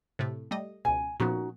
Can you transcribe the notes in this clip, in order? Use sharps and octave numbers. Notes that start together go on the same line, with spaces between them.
A2 C3 A3
G3 A3 D#5
C#2 B2 G#5
A#2 F3 B3 C#4 D#4 F#4